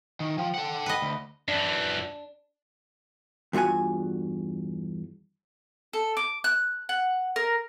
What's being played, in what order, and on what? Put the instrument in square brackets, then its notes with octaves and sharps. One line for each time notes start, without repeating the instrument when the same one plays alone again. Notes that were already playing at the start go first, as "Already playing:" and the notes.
[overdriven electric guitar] D#3
[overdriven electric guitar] F3 [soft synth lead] G5
[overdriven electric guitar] A4 F#5
[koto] B4 D#5
[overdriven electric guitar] D2
[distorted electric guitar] F#2 E3 [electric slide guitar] D4
[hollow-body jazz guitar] E2 G2 F4 F#4 G#5
[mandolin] A4
D6
F#6
F#5
A#4